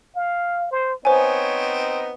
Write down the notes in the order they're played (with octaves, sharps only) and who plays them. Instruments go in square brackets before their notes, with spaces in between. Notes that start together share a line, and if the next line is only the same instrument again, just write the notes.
[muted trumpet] F5
C5
[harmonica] B3 C4 D#4 [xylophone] C5 G#5 [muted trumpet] C#5